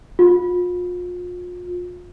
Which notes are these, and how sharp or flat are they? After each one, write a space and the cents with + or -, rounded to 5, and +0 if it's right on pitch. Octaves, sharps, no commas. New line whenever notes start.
F4 +35